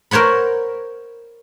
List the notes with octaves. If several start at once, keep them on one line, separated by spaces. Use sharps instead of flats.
A#4 C5 C#5 F#5 B5